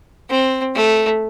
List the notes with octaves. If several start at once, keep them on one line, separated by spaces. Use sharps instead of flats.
C4
A3